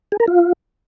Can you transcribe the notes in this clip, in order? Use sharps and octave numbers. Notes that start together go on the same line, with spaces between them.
G#4
A#4
F4